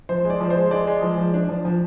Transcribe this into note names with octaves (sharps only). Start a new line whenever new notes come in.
F3 C5
G#3
D5
F3
C5
G#3
G#3 D5
G#3
F3
F3
D4
F3
F3